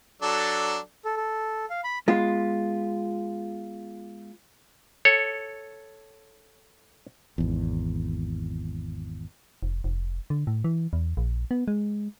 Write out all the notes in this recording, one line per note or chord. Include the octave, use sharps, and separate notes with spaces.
F#3 D4 A4
A4
A4
F5
B5
G#3 B3 F4
A4 C#5
G#1 E2
F1
F1
D3
A2
E3
E2
A#1
B3
G#3